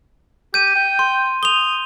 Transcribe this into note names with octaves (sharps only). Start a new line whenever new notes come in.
G4 G6 D#7
G5
C6
D#6 F7 G7